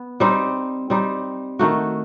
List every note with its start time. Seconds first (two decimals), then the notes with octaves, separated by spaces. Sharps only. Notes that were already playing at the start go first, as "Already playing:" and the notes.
Already playing: B3
0.20 G3 C4 D#4
0.90 G3 C4 D#4
1.59 D#3 A3 D#4 F#4